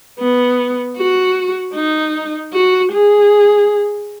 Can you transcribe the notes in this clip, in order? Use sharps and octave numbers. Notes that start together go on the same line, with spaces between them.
B3
F#4
D#4
F#4
G#4